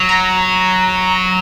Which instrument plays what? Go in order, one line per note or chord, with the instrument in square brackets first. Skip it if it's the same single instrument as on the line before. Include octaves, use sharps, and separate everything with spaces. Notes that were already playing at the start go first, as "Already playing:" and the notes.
Already playing: [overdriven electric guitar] F#3
[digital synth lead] A#5